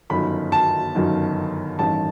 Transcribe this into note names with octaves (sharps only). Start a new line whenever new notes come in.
G1 F#2 D#3 B5
A5
G1 F#2 D#3
A1 G2 D#3 A5